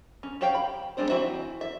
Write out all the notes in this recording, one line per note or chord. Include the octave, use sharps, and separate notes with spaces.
C#4
F#4 G4 C#5 F5 G5
B5
G3 G#3 C4 D4 C5
E3 C4 F#4 C5 E5
E5